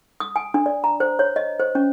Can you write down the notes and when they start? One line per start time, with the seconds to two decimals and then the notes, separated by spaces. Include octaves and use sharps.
0.20 D#6
0.36 G#5
0.54 D4
0.66 D5
0.84 A#5
1.00 C5
1.19 C#5
1.36 D#5
1.60 C5
1.75 C#4